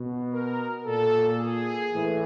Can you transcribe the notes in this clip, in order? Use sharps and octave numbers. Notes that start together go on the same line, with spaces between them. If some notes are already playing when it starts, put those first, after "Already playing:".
Already playing: B2
A#4
A#2 A4
G#4
A2 E3